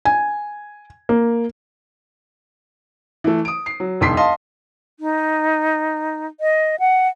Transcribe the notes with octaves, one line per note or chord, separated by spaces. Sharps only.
G#5
A#3
E3 A3
D#6 D7
C7
F#3
E1 B1 C6 B6 C7
D#5 F5 A5 C6
D#4
D#5
F#5